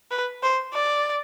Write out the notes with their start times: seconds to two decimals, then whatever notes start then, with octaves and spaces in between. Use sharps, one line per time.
0.11 B4
0.43 C5
0.74 D5